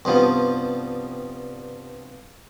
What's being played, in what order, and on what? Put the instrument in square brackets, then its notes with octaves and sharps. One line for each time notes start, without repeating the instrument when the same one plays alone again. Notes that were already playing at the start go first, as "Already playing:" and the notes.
[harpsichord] C2 G2 F3 B3